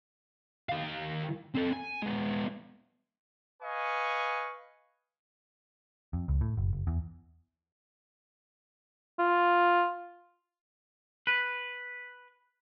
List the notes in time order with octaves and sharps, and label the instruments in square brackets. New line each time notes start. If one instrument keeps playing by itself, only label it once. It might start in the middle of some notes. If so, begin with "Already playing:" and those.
[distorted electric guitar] D#3 F5
C4 A4
G#5
G#3 B3
[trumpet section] B4 D#5 F5 G#5 C#6
[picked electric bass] F2
C#2
A2
F#1
F#1
E2
[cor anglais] F4
[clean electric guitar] B4